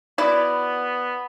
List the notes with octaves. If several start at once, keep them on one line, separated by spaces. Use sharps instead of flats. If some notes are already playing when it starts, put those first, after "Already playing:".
B3 E4 F#4 D5